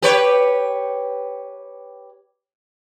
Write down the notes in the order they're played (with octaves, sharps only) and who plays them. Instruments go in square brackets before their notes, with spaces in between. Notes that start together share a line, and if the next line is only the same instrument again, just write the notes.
[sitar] G4 B4 C#5